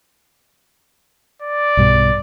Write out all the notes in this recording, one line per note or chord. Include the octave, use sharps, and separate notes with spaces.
D5
B1 G2 B2